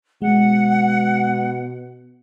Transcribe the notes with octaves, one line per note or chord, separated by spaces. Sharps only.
B2 G#3 F#5